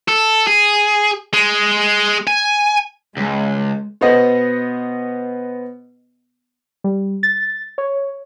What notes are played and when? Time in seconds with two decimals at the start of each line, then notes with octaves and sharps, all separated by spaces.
0.08 A4
0.47 G#4
1.33 G#3
2.27 G#5
3.17 C#2 G#3
4.01 B2 B3 C5 D#5 F#5
6.84 G3
7.23 A6
7.78 C#5